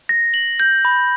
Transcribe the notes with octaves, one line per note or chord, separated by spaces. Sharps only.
A#6
F#7
G6
B5